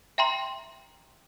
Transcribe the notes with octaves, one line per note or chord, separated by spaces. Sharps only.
E5 G5 A#5 C6